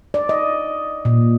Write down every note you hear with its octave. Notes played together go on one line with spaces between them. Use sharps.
D5
D#5
A#2